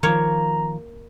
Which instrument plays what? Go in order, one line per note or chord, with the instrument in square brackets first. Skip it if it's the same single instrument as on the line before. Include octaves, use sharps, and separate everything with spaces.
[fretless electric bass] D#3 F3 [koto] A#3 C#5 [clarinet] A#5